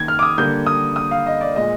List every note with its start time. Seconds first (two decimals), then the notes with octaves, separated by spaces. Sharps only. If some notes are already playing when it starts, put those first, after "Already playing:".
Already playing: D#3 A#3 G#6
0.08 F6
0.19 D6
0.23 D#6
0.38 D3 G3 A#3 G6
0.67 D#6
0.96 D#6
1.11 F5
1.26 D#5
1.41 D5
1.56 A#2 G#3 D#5